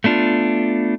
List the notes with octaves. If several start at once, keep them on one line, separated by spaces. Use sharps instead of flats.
A3 B3 D4 F4